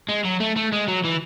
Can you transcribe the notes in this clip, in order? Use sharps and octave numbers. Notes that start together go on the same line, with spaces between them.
G#3
F#3
A3
A3
G#3
F#3
E3